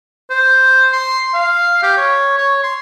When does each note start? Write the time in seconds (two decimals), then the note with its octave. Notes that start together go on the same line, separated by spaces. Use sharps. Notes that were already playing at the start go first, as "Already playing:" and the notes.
0.30 C5
0.93 C6
1.34 F5
1.83 G4
1.97 C#5
2.38 C#5
2.63 C6